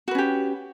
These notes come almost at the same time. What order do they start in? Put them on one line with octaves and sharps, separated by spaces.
F#4 B4 C#4 G4